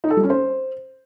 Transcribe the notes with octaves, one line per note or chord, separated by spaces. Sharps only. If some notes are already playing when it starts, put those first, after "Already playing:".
D#4
A4
G3
C#4
C5